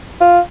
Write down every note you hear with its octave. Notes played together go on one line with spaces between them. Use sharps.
F4